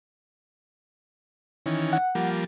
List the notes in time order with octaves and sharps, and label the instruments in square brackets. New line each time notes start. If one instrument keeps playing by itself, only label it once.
[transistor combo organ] D#3 E3 C#4
[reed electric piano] F#5
[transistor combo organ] F3 G3 A#3